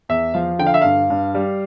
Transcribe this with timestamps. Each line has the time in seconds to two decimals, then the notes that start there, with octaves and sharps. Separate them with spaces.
0.09 E2 E5
0.34 F3 F5
0.59 D3 G5
0.67 F5
0.74 E5
0.82 G2 F5
1.10 G2
1.34 G3